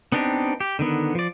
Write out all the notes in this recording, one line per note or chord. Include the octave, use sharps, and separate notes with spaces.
B3 C4 D4 D#4 G4
G4
D3 D#3 B3
F3 D5